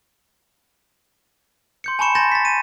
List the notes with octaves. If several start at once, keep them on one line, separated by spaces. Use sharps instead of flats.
C6 G6 C#7
G#5 A5 B5 C#6 C#7 E7
G#5 C6 G6 A6 A#6 E7
A6 B6
D#7